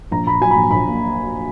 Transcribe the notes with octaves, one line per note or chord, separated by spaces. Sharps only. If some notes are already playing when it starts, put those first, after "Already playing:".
A#1 A#5
A#2 B5
F#3 G#5
B5
A#1
A#1 B5
A#2